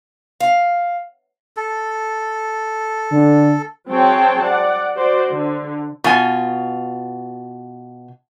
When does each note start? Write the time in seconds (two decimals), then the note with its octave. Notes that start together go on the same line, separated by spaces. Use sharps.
0.40 F5
1.57 A4
3.12 D3
3.89 F#3 C4 G#4 C#5 G5 A5
4.43 D5 F#5
4.95 F#4 C5 D5
5.30 D3
6.04 B2 F4 G#5